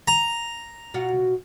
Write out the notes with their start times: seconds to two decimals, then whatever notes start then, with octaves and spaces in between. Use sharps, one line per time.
0.08 A#5
0.94 B2 F4 F#4